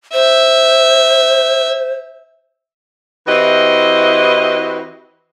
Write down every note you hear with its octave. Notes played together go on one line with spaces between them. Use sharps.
C5 E5
E3 C4 E4 F#4 G4 D#5